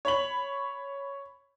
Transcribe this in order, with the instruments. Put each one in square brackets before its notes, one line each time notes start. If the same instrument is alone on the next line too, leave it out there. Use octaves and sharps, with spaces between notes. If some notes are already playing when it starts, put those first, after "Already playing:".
[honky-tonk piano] C#5 B5 F#7